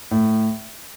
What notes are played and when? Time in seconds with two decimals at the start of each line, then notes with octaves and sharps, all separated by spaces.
0.11 A2